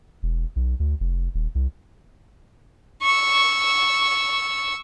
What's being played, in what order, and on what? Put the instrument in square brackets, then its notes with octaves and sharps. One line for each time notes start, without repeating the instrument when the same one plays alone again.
[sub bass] E1
B1
D2
F1
D#1
C2
[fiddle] C#6 E6